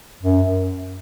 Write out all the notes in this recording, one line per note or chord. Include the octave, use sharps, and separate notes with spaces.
F#2